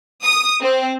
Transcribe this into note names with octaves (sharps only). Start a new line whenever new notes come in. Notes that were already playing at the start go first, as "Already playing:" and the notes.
D#6
C4